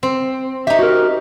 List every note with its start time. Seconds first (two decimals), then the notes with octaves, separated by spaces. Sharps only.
0.03 C4
0.67 D#4 G4 E5
0.79 F#4 A#4